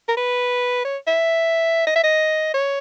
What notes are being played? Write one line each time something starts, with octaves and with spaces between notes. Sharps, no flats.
A#4
B4
C#5
E5
D#5
E5
D#5
C#5